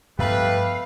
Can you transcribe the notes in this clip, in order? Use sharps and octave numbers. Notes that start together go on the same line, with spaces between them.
G2 F3 A3 B3 G4 B4 F5